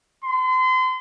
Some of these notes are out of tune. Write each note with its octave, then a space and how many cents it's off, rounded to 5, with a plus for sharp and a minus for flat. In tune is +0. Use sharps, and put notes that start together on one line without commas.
C6 -35